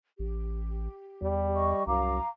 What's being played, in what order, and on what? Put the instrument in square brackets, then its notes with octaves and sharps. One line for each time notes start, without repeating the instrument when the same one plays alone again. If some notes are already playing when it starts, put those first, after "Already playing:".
[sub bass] A1 [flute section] G4
[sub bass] E2 [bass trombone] G3
[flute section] D#5 C#6
[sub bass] C2 [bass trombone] F#2 [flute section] F5 A#5 D6